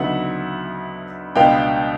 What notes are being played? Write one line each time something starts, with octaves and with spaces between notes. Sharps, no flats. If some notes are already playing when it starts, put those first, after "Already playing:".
Already playing: D2 C#3 F#3 B3 D#4 E5 F#5
C#2 B2 G#3 B3 D4 F5 G5